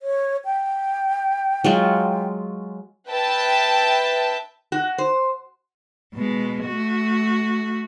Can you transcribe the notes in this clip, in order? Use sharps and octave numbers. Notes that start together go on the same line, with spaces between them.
C#5
G5
F#3 G#3 F4
B4 E5 G5 A5
F#4
C5
B2 G#3
A3 F#4